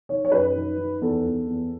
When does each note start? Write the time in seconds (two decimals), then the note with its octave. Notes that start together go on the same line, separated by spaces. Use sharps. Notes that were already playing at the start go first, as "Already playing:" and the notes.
0.09 D#3 C#5
0.25 C#5
0.32 F#2 B4
0.56 D#3
0.78 D#3
1.01 E2 A4
1.25 E2
1.48 E2